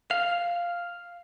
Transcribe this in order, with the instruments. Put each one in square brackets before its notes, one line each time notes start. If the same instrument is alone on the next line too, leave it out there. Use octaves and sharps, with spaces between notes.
[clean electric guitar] F5